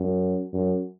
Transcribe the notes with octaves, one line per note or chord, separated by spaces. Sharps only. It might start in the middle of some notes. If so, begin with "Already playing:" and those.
Already playing: F#2
F#2